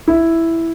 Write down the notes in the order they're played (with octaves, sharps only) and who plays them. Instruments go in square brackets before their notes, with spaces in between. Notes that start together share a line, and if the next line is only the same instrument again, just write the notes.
[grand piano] E4